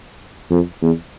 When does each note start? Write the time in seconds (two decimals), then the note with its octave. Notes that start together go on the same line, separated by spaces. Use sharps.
0.50 F2
0.82 E2